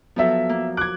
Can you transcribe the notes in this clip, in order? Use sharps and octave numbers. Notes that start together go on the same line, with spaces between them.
F3 F#3 B3 A4 E5
A#3
D6 F#6 G#6